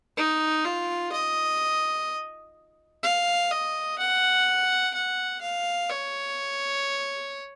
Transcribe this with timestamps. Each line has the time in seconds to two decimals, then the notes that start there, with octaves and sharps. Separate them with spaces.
0.17 D#4
0.65 F4
1.12 D#5
3.03 F5
3.51 D#5
3.99 F#5
4.94 F#5
5.42 F5
5.90 C#5